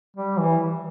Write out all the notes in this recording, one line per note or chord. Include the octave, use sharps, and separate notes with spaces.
G3
E3